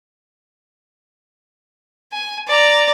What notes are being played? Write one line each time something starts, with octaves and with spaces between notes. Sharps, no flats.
G#5
D5 A#5